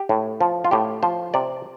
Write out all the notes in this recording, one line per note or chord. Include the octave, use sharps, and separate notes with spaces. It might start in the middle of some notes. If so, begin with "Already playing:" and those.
Already playing: G4
A2
F3
F4
A2 G4
F3 C5
C3 D5